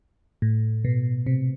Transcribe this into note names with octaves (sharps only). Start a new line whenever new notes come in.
A2
B2
C3